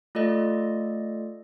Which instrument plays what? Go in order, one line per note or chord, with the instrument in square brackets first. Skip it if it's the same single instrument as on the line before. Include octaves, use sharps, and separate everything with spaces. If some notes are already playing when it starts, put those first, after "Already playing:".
[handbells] A3 F4 A4 D5 D#5